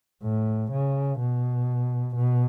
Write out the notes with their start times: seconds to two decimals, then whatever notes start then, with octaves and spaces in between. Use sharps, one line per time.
0.23 A2
0.72 C#3
1.20 B2
2.16 B2